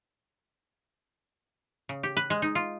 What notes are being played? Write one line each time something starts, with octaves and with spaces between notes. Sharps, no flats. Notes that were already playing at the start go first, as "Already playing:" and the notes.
C#3
G4
B4
G#3
D#4
F4